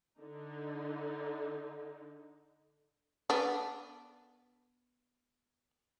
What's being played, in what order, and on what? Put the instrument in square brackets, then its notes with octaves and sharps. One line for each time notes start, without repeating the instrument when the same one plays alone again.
[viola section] D3 D#4
[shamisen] B3 D4